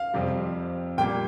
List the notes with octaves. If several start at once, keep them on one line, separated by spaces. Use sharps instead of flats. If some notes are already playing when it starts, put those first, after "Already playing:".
Already playing: F5
F2 C3 G3
A#2 G3 A#3 G5